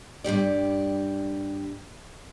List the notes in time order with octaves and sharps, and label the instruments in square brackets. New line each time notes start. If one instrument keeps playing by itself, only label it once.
[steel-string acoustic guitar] G2 C#3 G4 D5